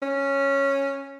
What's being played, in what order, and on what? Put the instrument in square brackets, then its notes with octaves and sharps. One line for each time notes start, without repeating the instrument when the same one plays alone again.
[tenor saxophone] C#4